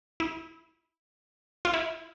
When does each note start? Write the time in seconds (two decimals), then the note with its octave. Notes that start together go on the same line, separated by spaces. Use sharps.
0.20 E4
1.65 F4
1.74 E4